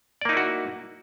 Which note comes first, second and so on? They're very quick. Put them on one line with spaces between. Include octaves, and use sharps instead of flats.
D5 A#3 D#4 E4 F#4